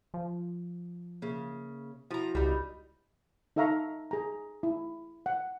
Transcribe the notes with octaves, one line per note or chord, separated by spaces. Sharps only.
F3
C#3 A#3
F3 E4 F#4 A#5
C#2 G3 D#4
D#4 A4 E5 F5 A#5 C#6
G#4 A#5
E4
F#5